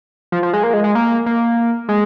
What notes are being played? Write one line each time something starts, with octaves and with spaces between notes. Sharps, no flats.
F3
F3
G#3
A#3
G#3
G#3
A#3
A#3
G#3